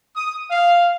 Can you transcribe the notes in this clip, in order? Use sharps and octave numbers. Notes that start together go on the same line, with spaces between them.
D#6
F5